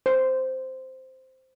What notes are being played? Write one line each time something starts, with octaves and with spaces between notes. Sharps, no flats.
C5